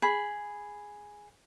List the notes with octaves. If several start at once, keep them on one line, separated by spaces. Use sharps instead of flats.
G#4 B5